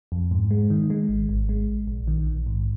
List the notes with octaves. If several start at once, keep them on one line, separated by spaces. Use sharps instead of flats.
F2
G#2
G#3
D#3
G#3
G#1
G#1
G#3
G#1
A#1
D#3
A#1
G#2